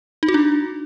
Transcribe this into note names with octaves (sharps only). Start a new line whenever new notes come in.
D#4
F#4
D4